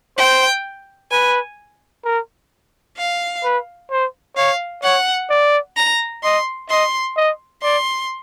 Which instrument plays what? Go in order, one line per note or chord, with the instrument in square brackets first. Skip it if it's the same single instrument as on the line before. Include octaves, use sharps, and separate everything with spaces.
[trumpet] C5 [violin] G5
[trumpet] B4 [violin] G#5
[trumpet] A#4
[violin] F5
[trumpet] B4
C5
[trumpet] C#5 [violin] F5
[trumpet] C#5 [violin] F#5
[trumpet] D5
[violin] A#5
[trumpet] D#5 [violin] C6
[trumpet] D#5 [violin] C6
[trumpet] D#5
[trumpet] D5 [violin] C6